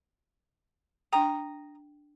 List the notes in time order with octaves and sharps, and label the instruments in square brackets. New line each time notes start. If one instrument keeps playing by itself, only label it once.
[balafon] D4 G5 [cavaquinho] A#5 D#6